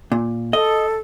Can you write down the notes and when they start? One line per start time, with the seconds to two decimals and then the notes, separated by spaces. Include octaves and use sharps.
0.12 A#2
0.53 A4 D#5